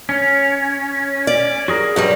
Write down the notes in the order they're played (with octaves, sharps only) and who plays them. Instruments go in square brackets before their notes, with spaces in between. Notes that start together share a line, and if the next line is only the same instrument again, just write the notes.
[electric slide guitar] C#4
[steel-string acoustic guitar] D5
[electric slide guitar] F#4 G#4 A#4
[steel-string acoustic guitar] G2 F#3 G3